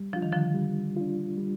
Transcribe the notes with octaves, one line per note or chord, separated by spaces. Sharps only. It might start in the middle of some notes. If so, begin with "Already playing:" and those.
Already playing: G3
F3 D4 F4
D#3
D3 F3
G3
D4 F4
G3